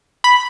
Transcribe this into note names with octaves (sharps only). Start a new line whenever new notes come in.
B5